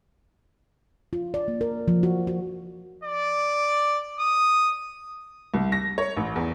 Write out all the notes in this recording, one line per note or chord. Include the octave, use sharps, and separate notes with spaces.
F4
D5
A#3
A#4
F3
F#4
F#4
D5
D#6
C2
A#6
C#5
A1
E2